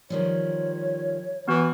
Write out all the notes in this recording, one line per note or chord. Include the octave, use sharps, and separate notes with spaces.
D#3 F3 G3 C#5
E3 B3 F#4